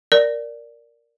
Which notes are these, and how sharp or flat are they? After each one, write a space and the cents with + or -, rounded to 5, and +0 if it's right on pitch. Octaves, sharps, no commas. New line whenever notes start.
A#4 +0 D5 +0